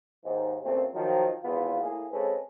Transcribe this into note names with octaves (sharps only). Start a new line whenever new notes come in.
D#2 G#2
A#2 C#3 A3 A#3 C4
D#3 F3 F#3
G#1 E2 B3 F4
A2 A#3 G#4
C#3 G#3 C4 C#4 A4 B4